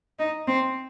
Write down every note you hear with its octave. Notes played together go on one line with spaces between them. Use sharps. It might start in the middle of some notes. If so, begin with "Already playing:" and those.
D#4
C4